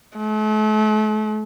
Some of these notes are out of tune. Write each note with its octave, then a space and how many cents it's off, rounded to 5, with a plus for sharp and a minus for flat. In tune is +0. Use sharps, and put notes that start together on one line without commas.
A3 -40